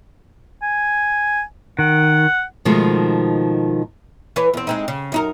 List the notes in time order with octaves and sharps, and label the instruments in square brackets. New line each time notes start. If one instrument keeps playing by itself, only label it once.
[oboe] G#5
[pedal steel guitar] D#3 [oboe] F#5
[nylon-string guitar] B2 D#3 F3 G#3 A3
[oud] E3 B4 C#5
E2 C4
G#3 C4 D#4
C#3
F#2 D#4 A#4